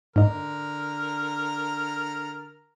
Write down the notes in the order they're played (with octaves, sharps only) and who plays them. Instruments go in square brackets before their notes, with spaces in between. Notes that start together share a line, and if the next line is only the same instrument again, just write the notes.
[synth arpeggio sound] G#2 D#5 [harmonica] D3 A#4 F6